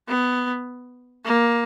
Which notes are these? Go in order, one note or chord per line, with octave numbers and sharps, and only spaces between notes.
B3
A#3